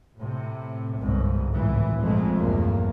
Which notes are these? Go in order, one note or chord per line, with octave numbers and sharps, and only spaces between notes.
A2 C3
G1 C2 G#2
G#1 C#2 A2 E3
A#1 F2 B2 G#3 A3
B1 E2 G2 A#3